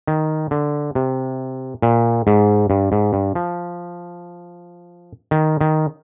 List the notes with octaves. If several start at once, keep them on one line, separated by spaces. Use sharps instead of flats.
D#3
D3
C3
A#2
G#2
G2
G#2
G2
F3
D#3
D#3